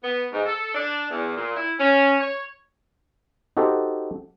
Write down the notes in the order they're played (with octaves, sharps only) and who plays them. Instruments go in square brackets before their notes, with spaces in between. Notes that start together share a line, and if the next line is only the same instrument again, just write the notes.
[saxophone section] B3
G#2
A4
D4
E2
A#2
E4
C#4
C#5
[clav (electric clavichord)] D#4 F#4 G4 A4 C5